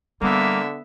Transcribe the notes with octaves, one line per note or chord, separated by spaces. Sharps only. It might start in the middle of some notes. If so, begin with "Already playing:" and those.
D3 G3 A#3 B3 E5